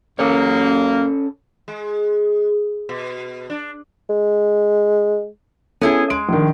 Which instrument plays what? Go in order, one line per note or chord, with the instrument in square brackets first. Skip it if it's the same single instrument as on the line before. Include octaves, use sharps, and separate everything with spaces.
[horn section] F#2 A#3 [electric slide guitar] C#4 A4 C#5
[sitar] G#3
B2
D4
[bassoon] G#3
[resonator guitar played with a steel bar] B3 E4 G#4 [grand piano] C#4 A4
[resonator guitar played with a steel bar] G#3 [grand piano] D7
[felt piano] A#1 D#3